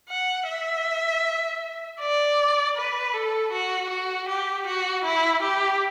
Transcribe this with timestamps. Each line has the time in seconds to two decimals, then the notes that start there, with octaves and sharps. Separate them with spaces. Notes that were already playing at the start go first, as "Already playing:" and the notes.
0.09 F#5
0.48 E5
2.00 D5
2.76 B4
3.14 A4
3.53 F#4
3.90 F#4
4.28 G4
4.67 F#4
5.04 E4
5.42 G4